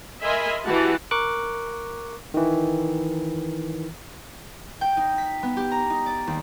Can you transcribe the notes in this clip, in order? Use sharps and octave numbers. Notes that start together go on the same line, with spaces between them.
A#4 D#5 E5 G#5 B5 C6
E3 F#4 G4 A5
A#4 C#6 D6 F#6
D#3 E3
G5
D#4
B6
B3
G4
A#5
D#4
D5
D#2